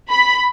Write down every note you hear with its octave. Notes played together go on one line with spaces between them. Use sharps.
B5